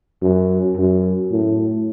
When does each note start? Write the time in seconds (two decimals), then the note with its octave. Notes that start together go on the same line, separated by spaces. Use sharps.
0.22 F#2
0.77 F#2
1.31 A2